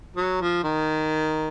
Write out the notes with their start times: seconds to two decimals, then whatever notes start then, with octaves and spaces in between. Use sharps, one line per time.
0.16 F#3
0.41 F3
0.63 D#3